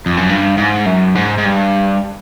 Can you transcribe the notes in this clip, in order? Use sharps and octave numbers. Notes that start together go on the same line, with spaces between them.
F2
F#2
G2
G#2
F#2
G#2
G#2
G2